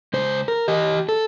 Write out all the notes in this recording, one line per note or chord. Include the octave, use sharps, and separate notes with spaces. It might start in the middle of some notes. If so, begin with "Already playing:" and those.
C#2 C5
A#4
G4 D#5
A4